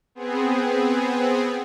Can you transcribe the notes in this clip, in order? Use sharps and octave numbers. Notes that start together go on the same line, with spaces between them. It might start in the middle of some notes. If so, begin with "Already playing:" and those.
B3 C4 G#4